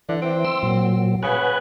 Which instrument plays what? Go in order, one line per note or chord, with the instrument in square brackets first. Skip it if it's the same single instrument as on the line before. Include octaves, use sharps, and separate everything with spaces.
[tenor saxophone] D3 [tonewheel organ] E3
[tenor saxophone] C4
[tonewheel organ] C6 E6
A#2 F#3
[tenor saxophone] C#3 [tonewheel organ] B4 F#5 G#5